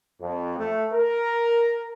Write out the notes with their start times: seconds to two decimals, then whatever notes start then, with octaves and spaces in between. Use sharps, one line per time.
0.20 F2
0.58 A3
0.93 A#4